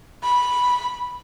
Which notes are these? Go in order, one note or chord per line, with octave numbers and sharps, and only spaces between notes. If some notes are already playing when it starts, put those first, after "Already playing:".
B5